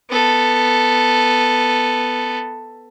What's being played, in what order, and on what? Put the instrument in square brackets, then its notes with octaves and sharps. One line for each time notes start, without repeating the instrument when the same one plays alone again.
[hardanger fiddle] B3 A4